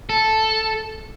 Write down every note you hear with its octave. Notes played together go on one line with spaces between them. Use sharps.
A4